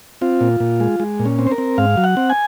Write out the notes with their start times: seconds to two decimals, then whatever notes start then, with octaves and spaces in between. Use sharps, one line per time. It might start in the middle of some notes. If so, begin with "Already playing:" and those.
0.21 C4 F4
0.41 A#2
0.60 A#2
0.80 G#3
1.00 G#3
1.19 A#2
1.26 C#4
1.39 C4
1.47 C5
1.51 A#4
1.58 C4
1.78 G#2 F5
1.97 F#3
2.04 F#5
2.17 C4
2.30 G#5